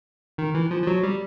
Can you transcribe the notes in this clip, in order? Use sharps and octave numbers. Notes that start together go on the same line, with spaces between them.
D#3
E3
F3
F3
F#3
G3